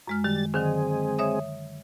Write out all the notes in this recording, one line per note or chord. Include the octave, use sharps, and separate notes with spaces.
F#2 G#3 F6
D#3 G3 A6
D3 D#3 F#3 G#3 C4 G#4
C#5 E5 D#6